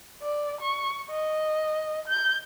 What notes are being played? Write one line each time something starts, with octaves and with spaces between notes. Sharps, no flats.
D5
C#6
D#5
G6